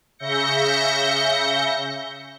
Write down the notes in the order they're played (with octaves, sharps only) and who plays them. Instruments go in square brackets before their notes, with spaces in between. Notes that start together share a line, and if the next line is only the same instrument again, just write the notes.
[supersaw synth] C#3 E5 G6 A#6 C#7